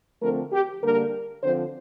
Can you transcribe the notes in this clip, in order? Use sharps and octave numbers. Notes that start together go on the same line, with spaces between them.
D3 F3 A3 C4 A#4
G4
D3 G3 A#3 D4 A#4
D3 F3 C4 C5